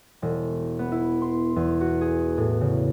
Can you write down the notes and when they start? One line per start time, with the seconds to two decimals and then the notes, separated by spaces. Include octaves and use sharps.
0.22 E1
0.79 B3
0.92 E4
1.22 C6
1.56 E2
1.81 F#4
2.01 G#4
2.38 A2
2.61 C#3